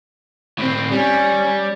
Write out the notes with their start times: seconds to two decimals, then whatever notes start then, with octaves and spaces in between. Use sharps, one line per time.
0.58 A2 C4
0.92 G3 C#4